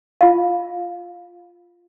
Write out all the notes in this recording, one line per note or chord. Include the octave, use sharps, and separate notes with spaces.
F4 F5